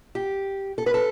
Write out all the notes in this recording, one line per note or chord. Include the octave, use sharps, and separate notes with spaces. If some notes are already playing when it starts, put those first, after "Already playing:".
G4
A4
B4
A4